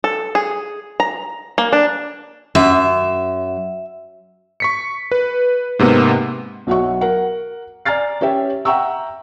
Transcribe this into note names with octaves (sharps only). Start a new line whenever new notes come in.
A4
G#4
A#5
A#3
D4
F#2 E5
C#6 B6 C#7
B4
G#2 C3 A#3 B3
B1 F#3 F#4 E5 C#6
A#4 F#5
D5 G#5 A#5 F6 A6 C7
C#4 G4 C#5 E5 G5
E5 F#5 G5 A#5 C#6 E6